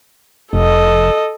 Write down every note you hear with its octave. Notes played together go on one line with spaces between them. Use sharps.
F1 A4 D#5